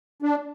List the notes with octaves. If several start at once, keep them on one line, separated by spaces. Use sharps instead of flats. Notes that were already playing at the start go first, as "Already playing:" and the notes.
D4